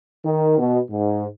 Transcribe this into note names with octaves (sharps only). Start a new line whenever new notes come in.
D#3
B2
G#2